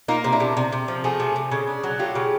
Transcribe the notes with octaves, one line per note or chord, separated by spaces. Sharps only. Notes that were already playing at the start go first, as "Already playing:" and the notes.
A#3 D#4 F4
C3
D4 E4
C3
C3
C3
F3
A3 F#4 G#4
C3
C3
C#3
D4
F#3
A3 F4 G4
C#3